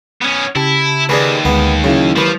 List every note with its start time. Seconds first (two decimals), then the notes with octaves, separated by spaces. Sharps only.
0.22 B3 C#4
0.56 C#3 E4 G4 A5
1.09 D#2 D4 G#4 B4
1.45 D2 G#3 B3
1.84 C#3 F#3 E4
2.16 D#2 F3 B4